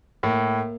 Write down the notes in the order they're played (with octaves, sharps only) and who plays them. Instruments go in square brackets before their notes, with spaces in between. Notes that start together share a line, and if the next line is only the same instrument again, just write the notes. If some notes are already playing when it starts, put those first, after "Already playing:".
[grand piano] A2 [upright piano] A#3